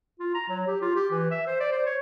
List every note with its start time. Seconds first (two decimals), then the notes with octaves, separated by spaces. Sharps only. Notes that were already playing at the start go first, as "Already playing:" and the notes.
0.20 F4
0.34 A#5
0.49 F#3
0.67 G4
0.82 F4
0.96 G4
1.11 E3
1.31 E5
1.47 C5
1.60 D5
1.72 C5
1.86 C#5